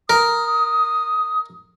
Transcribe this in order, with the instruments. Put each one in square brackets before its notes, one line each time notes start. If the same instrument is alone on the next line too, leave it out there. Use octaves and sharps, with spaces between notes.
[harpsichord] A#4 [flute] D#6